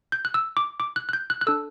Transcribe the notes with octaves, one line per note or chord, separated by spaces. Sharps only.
G6
F#6
E6
D6
D6
F#6
F#6
G6
F#6
F#6
D4 A4 E6